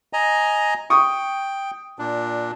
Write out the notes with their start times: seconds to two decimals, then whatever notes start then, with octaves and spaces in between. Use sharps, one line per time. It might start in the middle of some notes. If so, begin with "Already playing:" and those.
0.13 D#5 G#5 A#5
0.90 G5 C#6 D#6
1.99 A#2 D4